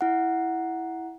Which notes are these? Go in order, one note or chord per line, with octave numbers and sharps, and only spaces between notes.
E4 F#5